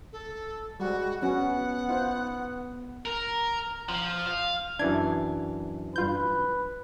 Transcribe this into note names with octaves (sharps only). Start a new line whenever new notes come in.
A4
G3 G#3 F#4
F#3 B3 C#4 F#4 F#5
D#4 F4 C5
A#4
F3
F5
F#2 E3 D4 G#6
G2 F4 B4 G6